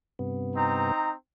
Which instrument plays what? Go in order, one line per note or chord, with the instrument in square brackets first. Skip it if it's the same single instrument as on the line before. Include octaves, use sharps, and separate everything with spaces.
[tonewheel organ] G2 C3 B3
[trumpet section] C4 D#4 A#5